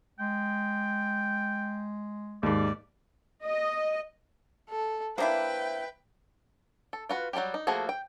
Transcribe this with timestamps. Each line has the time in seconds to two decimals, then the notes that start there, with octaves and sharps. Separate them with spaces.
0.19 G#3 G5
2.43 D#2 G#2 D5
3.45 D#5
4.70 A4
5.18 A#3 D4 E4 B4 C5 E5 G5
6.93 A4
7.09 F4 F#4 B4
7.33 F#3 G3 A3 A#3 G4
7.54 D#4
7.67 F3 A3 A#3 F#4 G#4
7.89 G5